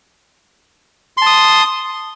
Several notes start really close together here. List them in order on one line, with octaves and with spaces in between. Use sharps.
C6 A5 D#6